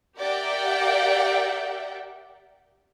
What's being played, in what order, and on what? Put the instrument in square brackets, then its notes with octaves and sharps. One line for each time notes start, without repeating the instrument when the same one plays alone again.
[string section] G4 A#4 D5 E5 F#5 G5